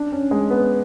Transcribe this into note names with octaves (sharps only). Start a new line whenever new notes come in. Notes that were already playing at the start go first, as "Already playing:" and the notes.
Already playing: D4
C#4
G#3
B3